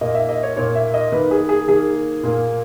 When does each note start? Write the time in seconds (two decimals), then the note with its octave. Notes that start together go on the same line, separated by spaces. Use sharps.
0.01 A#2 A#3 D#5
0.15 E5
0.29 D#5
0.43 C#5
0.56 A#2 A#3 C#5
0.75 E5
0.94 D#5
1.12 D#3 A#3 B4
1.31 G#4
1.49 G#4
1.68 D#3 A#3 G#4
2.23 A#2 A#3